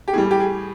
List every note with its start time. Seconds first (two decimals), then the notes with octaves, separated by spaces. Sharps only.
0.08 G4
0.13 A2 E3 G3 G#4
0.31 G4
0.40 G#4